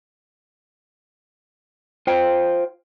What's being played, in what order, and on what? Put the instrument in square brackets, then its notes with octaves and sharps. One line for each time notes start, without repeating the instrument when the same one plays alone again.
[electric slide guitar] F4 C5 G5